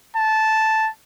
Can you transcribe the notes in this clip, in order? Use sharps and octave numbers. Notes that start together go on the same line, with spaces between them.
A5